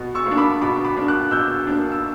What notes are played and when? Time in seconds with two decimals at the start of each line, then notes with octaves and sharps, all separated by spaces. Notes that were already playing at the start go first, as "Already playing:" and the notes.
Already playing: B2
0.15 C#6 E6
0.26 A#3
0.31 D4
0.38 B5 D6
0.62 B2 B5 D6
0.84 B5 D6
0.97 A#3 D4
1.08 D6 F#6
1.31 B2 E6 G6
1.67 A#3 D4
1.92 E6